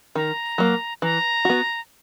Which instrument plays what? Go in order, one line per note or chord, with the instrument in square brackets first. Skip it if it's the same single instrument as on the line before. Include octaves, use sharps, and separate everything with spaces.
[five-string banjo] D#3 [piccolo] A#5
[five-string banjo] F#3 A#3
[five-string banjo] E3 [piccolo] A#5
[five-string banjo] B3 F#4